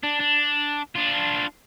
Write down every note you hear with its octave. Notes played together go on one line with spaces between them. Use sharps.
D4
D4
D4 F4